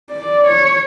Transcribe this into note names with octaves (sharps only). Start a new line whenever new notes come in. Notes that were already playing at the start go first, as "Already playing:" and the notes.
D5
C#5